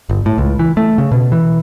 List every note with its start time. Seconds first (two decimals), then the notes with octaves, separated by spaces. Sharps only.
0.09 G1
0.26 A2
0.38 C#2
0.59 E3
0.77 A3
0.98 C#3
1.12 B2
1.32 E3